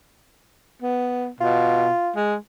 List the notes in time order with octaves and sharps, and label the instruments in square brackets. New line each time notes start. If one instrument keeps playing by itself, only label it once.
[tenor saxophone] B3
[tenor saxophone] B2 [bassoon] F4
[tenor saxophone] G#3